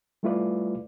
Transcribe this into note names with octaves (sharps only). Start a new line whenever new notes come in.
G3 A3 E4 F4 B4 D5